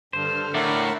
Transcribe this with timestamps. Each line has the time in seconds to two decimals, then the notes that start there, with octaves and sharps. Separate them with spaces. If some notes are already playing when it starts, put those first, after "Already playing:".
0.13 G2 D3 A4 C5 F6
0.55 A2 A#4 D5 E5 F#5